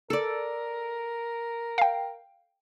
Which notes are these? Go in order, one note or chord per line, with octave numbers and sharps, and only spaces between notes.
A4 A#4 D5
F5 G5